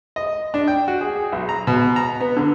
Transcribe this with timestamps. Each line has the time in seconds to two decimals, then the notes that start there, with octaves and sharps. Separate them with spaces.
0.16 D#5
0.54 D4
0.68 G5
0.88 F#4
1.01 G#4
1.16 G#4
1.32 B1
1.49 A#5
1.67 B2
1.96 A#5
2.20 B3
2.37 D3